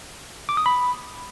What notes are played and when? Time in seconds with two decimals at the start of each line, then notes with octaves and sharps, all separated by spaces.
0.49 D6
0.57 D#6
0.66 B5